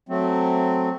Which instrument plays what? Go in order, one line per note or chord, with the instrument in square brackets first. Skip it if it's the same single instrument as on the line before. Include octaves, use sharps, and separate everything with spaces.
[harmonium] F#3 A3 C4